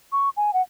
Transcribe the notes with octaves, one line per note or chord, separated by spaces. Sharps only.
C#6
G#5
F#5